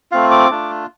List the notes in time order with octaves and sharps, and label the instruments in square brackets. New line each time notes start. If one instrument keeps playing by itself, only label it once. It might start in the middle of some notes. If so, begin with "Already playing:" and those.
[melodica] A3 C4 F4 F5
D6
A3 D4 F4